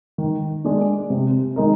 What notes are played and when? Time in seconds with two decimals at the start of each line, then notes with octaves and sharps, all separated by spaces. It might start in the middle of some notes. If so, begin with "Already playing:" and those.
0.18 D#3
0.64 G#3 D4
1.10 C3
1.56 D#3 G#3 D#4 A#4